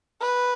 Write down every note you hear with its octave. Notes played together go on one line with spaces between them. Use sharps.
B4